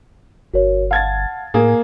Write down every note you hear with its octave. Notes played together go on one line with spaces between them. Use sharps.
G1 F#4 A#4 C#5
F5 F#5 A5 G#6 A6
A2 A#3 G#4 G#5